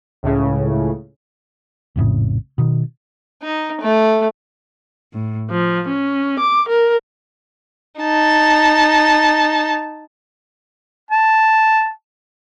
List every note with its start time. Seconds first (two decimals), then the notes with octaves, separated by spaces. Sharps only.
0.23 C#2 A2 C#3
1.96 A#1 F2 A2 C#3
2.58 B2 D#3
3.42 D#4
3.81 A3
5.13 A2
5.51 F3
5.88 C#4
6.38 D6
6.68 A#4
8.01 D#4 A5
11.11 A5